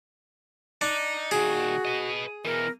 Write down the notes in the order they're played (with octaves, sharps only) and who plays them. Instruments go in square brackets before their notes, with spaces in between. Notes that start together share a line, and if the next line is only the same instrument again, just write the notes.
[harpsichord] D4 [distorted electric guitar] D#4
[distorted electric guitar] A#2 D#3 [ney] F#4 [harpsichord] G#4
[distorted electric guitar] B4 D#5
[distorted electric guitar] B2 E3 [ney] A#4